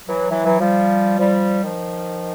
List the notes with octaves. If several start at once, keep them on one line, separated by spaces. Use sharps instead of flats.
E3 F#3
E3 F#3
E3 F#3
F3 G3
F3 G3
D#3 F3